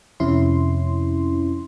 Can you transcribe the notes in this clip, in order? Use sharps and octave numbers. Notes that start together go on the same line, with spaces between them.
F2 C3 C#4 E4 C6